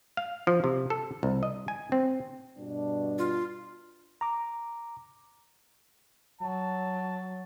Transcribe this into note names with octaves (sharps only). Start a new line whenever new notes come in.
F5
F3
C3
A4
C2
D#5
G#5
C4
G2 B2 D4
F4
A#5 D6
F#3 A5